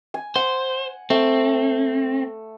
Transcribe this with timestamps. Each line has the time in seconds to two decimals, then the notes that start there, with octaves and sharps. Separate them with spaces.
0.14 G#5
0.36 C5 F#5
1.10 A3 C4